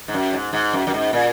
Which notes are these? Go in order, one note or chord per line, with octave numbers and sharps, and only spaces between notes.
G#2
F#2
G#2
G#2
F#2
F#2
G#2
A#2